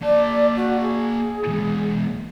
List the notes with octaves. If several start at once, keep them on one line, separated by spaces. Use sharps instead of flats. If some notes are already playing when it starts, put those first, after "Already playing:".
A#3 D5 A5
F#4
G#4
E2 G#3